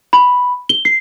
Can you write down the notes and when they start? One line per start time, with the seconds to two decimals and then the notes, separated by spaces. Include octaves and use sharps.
0.13 B5
0.69 G7
0.85 C7